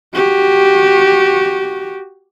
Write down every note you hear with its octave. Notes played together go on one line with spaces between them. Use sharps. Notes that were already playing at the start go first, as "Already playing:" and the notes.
F#4 G4